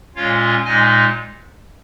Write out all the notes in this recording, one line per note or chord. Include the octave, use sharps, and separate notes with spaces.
A#2 G#3 C#4 F4 C#5 F5
A#2 G#3 D#4 D#5 G#5